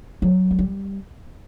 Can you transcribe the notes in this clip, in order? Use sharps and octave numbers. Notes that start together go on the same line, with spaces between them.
F#3
A3
G3